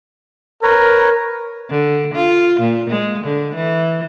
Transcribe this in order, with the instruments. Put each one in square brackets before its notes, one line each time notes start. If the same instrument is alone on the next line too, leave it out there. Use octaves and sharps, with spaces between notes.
[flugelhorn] A#4 [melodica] B4 C#5 A#5
[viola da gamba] D3
F4
A#2
G#3
D3
E3